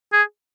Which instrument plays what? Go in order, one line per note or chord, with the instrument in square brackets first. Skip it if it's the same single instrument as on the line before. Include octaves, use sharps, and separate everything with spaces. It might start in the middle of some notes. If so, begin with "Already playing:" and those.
[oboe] G#4